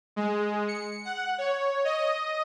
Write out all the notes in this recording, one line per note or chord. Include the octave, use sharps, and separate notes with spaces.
G#3
C#7
F#5
C#5
D#5